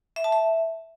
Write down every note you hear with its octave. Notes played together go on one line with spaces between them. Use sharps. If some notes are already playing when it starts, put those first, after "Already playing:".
E5
A5
E5